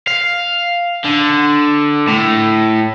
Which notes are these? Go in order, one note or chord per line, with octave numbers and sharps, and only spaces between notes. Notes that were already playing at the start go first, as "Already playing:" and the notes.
F5
D3
A2